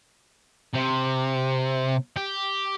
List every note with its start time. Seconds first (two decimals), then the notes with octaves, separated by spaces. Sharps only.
0.73 C3
2.16 G4